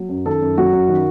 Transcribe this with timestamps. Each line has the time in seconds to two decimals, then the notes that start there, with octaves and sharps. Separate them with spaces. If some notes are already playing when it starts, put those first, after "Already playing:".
Already playing: F#3
0.09 F#2
0.26 D#3 A4
0.42 F#2
0.58 F#3 F#4
0.73 F#2
0.89 D#3